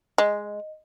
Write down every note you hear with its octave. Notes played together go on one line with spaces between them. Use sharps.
G#3 D#5